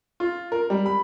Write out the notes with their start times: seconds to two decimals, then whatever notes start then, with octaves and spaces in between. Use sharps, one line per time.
0.20 F4
0.52 A#4
0.70 G3
0.86 B5